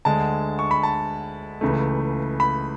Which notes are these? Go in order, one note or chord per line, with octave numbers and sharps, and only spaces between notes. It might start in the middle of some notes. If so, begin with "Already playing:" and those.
D2 D3 G#3 A5
C#6
B5
A5
C#2 C#3 E3 A3
B5